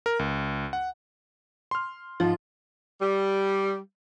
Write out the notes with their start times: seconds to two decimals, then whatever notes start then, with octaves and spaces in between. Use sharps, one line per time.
0.06 A#4
0.19 C#2
0.73 F#5
1.71 C6 F6
2.20 G#2 F3 F4
3.02 G3